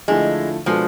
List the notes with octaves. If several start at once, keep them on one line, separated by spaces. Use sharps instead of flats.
D3 F3 G#3 A3 E4
B2 F3 G#3 D4 A4